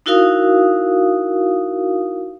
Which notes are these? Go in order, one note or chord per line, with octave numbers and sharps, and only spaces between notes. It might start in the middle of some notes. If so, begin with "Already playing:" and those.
D#4 E4 F#4 A#4 F5 D#6